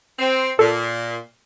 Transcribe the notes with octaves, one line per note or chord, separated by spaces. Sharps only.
C4
A#2 A4